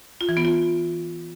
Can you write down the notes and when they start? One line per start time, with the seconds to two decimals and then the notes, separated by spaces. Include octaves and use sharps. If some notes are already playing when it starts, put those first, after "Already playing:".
0.21 F4
0.29 E3
0.37 B3
0.45 F4